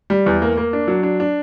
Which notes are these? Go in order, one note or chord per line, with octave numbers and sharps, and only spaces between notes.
G3
E2
A#3
A#3
D4
F#3
D4
D4